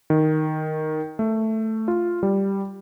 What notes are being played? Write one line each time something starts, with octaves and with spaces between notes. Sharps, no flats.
D#3
A3
F4
G3